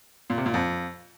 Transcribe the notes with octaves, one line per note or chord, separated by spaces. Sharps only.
A#2
C3
A#2
F2